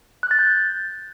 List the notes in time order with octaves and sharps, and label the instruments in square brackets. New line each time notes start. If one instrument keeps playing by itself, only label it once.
[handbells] F#6
A6
G6